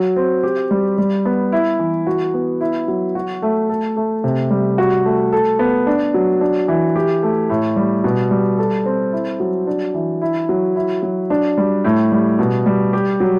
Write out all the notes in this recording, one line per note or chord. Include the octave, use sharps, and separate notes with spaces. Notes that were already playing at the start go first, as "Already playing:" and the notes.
Already playing: F#3
C4
G4
G3
G3
B3
E4
E3
F#4
B3
E4
F#3
F#4
A3
A4
A3
C3
G3
F#4
A3
A4
B3
D4
F#3
D4
E3
G4
A3
A2
G3
B2
G3
A4
C4
E4
F#3
D4
E3
E4
F#3
E4
F#3
D4
G3
A2
G3
B2
G3
G4
F#3